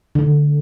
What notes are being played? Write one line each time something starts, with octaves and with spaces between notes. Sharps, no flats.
D3